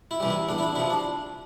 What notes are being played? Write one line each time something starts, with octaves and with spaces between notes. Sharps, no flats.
E4
C3 E3 G3
E4
E2 D4
E4
D4
C3 F3 E4
D4